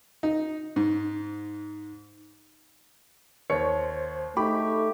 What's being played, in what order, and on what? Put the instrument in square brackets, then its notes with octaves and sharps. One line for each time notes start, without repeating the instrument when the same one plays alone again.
[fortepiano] D#4
G#2
[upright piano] D#2 C#5 C#7 [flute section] C5
[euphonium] A3 [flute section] D#4 G#4 C#6 [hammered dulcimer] G4 [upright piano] B5